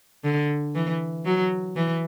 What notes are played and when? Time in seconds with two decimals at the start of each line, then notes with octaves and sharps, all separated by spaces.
0.24 D3
0.75 E3
1.26 F#3
1.76 E3